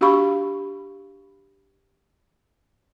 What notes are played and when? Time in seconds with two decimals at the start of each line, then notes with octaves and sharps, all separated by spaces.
0.01 D4 F#4 G4 F5 B5 C#6